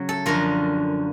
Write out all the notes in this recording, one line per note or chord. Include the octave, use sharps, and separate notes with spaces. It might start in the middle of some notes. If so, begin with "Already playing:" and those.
Already playing: C#3 F#3
A4
F#2 D3 F3 A#4